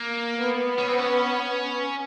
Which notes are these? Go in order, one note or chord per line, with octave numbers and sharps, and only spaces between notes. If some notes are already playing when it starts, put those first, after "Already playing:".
Already playing: A#3
B3
C#4
C4
C#4